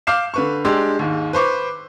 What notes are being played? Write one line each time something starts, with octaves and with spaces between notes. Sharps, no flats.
F5 D6 F6 G6 C7 E7
D3 B4 C#6
G#3 D4 G4 C6 E6
D#2 G#2
B4 C5 C#6 D6